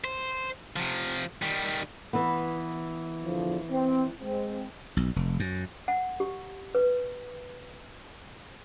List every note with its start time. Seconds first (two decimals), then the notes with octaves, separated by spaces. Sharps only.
0.04 C5
0.76 C3 F3
1.42 D#3 G3
2.13 E3 B3
3.24 E2 D3 F3
3.71 C4
4.21 G#3 C4
4.97 B1
5.16 F1
5.40 F#2
5.88 F#5
6.20 G4
6.75 B4